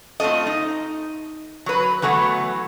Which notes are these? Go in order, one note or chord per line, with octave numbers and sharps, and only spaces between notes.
A3 C4 F4 A4 D#5
D#4
F#3 B4
E3 F#3 A3 B3